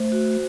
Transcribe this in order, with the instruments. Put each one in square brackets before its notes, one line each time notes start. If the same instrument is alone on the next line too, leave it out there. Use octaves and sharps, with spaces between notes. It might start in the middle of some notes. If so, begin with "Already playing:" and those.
Already playing: [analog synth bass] A3 [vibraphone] C5
[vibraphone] F#4